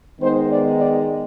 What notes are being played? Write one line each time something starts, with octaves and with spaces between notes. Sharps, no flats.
D#3 G#3 B3 D#4 C5
D5
D5